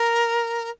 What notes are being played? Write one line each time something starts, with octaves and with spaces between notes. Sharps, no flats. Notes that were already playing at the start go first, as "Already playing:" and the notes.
Already playing: A#4